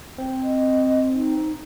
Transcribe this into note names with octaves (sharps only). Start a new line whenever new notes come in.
C4
D#5
D#4